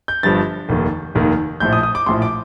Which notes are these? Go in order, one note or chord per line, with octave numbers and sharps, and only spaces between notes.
G6
G1 G2 F3 A6
F1 D#2 D#3
F1 D#2 D#3
A#1 A2 F3 G6
D#6
D#6
D6
A#1 A2 F3 C6
D6